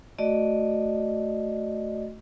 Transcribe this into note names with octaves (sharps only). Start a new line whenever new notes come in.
A3 F#4 D5 D#5